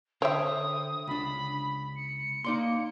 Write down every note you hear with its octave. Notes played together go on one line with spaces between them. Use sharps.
D3 C5 C#5 E5 G5 D#6
C#2 D4 B5
C#7
A#3 D#4 D5 C6